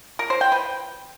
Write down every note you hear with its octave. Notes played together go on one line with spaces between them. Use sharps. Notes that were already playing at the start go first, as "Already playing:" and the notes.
A#4
C5
G5
B4